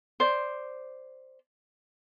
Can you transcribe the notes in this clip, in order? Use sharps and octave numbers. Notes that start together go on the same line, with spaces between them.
C5 D5